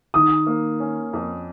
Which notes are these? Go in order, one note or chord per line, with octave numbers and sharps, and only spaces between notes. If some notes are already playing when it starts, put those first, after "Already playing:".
D#3 D#6
A#3
C#4
F2